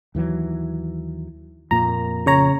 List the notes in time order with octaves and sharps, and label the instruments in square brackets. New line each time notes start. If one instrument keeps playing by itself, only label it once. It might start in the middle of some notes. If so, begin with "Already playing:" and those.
[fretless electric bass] D#2 E3 F#3
[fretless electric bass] F2 A#2 A#3 [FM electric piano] A#5
[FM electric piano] C#3 C#5 A#5